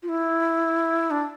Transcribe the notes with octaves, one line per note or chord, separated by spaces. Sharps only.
F4
E4
D4